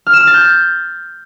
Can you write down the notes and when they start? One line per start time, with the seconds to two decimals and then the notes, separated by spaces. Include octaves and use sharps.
0.07 F6
0.13 E7
0.20 F6
0.27 A6
0.34 G6